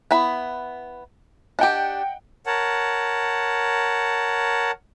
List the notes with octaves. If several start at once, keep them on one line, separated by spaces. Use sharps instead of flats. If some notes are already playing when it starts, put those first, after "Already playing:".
B3 E4 B5
D4 G4 D#5 F#5 G5
A#4 C#5 F#5 A5